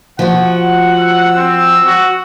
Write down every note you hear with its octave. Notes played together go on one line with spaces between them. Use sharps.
F3 F#4 F#5
E6
C4
F#4